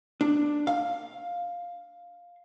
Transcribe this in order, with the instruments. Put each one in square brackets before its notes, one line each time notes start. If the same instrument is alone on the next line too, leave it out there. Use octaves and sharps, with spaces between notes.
[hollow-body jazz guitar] D4
F5